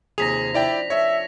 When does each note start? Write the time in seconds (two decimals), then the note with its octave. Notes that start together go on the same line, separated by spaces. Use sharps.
0.18 D#2 C3 F3 G#4 A#6 B6 F7
0.54 D4 E4 D5 E5 G5
0.90 F4 A4 C#5 E5